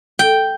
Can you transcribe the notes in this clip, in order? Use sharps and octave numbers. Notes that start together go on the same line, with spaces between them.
G5